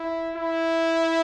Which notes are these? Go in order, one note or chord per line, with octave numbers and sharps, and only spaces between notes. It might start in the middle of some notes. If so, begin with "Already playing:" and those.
Already playing: E4
E4